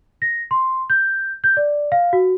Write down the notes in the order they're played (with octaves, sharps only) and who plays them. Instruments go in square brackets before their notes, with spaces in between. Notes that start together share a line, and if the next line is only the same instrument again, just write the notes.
[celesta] A#6
C6
G6
G6
D5
F5
F#4